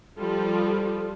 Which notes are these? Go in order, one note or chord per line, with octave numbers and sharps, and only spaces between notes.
F3 G3 F4 A4